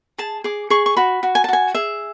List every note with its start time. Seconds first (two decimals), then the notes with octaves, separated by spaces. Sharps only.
0.18 G#4 A5
0.44 G#4 D6
0.70 G#4 C#6
0.86 C#6
0.97 F#4 B5
1.23 F#4
1.35 G#5
1.44 A5
1.48 F#4 G#5
1.74 G#4 E5